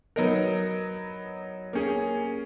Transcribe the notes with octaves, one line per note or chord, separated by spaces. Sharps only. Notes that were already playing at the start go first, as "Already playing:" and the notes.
F#3 B3 D#4 A#4
A#3 C#4 G#4